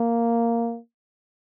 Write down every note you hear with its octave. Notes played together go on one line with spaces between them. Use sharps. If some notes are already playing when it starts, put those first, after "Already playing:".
Already playing: A#3